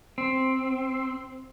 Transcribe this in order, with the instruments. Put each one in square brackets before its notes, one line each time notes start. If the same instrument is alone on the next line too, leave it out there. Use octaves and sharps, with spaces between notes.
[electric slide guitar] C4